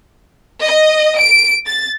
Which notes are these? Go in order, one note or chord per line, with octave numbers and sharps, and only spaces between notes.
D#5
D7
A6